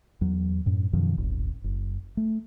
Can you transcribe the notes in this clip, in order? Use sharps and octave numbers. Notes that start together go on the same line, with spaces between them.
E2 F#3
F#2 A2
F#2 B2 D#3 F3
D#1 G#1
F#1
A3